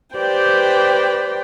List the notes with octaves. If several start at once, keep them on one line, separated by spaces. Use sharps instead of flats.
G4 B4 C5 D5 G5